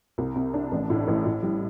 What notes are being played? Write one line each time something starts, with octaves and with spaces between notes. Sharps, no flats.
C2
C3
D4
A1
A2
A1
A2
G3